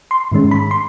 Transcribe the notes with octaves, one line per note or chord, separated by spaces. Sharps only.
C6
G#2 D#3 G#3 C#4
B5
C6